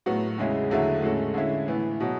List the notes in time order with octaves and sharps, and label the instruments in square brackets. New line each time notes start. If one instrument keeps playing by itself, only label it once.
[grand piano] A2 F#3 B3 F#4
E2 C#3 G#3 C#4 E4
E2 D3 F#3 A3 E4
A2 G#3 C#4 F#4 A4
D3 G#3 C#4 E4
A2 E3 B3
B2 F#3